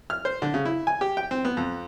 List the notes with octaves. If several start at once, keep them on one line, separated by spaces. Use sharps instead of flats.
F6
C5
D3
C#3
E4
G#5
G4
G5
C4
B3
F2